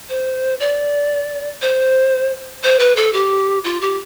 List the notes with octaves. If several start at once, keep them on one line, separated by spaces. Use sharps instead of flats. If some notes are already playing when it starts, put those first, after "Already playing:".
C5
D5
C5
C5
B4
A4
G4
F4
G4